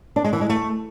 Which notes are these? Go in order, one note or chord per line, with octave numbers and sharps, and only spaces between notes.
D4
G#3
E3
G#3
A3